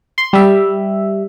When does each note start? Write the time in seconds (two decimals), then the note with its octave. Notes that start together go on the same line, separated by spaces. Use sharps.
0.18 C6
0.33 G3 E5